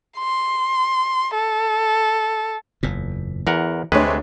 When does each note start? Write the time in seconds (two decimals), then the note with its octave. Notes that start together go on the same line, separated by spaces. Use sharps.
0.18 C6
1.34 A4
2.83 F#1 E2 A#2
3.47 E2 E3 A#4 F#5
3.92 D2 C3 G#3 A3 D4 B4 C#5